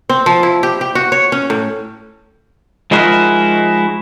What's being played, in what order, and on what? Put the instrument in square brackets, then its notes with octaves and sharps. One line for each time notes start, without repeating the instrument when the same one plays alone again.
[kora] C4
F3
E4
G4
G4
F#4
C#5
C#4
A2
[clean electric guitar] F3 G#3 D#4 E4 F#4 A#4